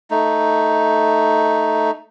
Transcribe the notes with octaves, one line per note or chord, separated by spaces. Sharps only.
A3 D#4